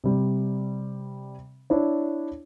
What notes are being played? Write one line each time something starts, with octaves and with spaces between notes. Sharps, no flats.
C3 G3
D4 E4 C#5